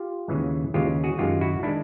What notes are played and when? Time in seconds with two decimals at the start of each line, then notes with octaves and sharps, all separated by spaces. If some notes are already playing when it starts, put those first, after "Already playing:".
Already playing: F4 G4
0.28 D#2 C#3 E3 G#3
0.74 D#2 C#3 E3 G#3 F4 G4
1.04 F#4 G#4
1.19 F#2 D#3 G#3 F4 G4
1.41 E4 F#4
1.63 D#3 G#3 D4 E4